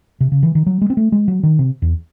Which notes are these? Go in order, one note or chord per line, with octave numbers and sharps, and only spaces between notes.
C3
C#3
E3
D#3
F#3
G#3
C4
A3
G#3
F#3
D#3
C3
E2